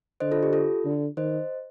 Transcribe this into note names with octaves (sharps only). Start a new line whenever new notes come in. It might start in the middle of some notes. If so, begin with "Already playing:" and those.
D3 C5 D#5
F4 A4
G4
F4 A4
D3
D#3 C5 D#5